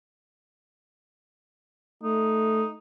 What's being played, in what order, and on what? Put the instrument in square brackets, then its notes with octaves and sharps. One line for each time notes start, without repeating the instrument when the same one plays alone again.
[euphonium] A3 [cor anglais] D#4